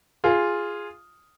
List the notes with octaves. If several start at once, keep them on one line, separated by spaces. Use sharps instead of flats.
F4 G#4